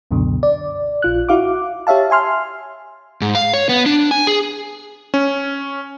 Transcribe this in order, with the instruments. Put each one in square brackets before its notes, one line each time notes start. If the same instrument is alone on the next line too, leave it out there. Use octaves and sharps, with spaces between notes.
[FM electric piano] C#2 F#2 B2 D3
D5
A#1 F4 F#6
E4 F#4 F5 D6
G4 C#5 E5 F5 A5
E5 G#5 C6 F6
[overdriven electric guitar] G#2
F5
C#5
B3
D4
G#5
G#4
[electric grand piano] C#4